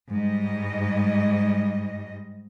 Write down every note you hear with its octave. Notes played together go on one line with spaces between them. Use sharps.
G#2 G3 D#5